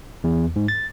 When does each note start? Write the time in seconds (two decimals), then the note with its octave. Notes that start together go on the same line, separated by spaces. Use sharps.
0.24 E2
0.56 G#2
0.68 A6